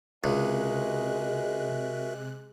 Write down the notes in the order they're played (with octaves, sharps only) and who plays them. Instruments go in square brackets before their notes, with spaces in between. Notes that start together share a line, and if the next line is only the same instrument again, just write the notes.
[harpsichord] C#2 [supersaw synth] C3 F#6 [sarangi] G#3 [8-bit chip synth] F#4 A#4 E5